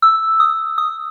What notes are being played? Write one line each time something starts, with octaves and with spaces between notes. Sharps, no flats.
E6
D#6
D#6